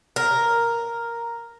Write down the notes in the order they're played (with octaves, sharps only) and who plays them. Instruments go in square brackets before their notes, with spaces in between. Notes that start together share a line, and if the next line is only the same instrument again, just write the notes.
[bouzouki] A#4